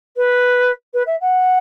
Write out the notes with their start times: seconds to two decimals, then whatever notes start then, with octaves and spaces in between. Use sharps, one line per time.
0.16 B4
0.93 B4
1.06 E5
1.20 F#5